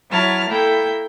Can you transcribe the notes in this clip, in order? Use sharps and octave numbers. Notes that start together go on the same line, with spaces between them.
F#3 E4 C#5 A5 F6
A#3 E4 A4 G5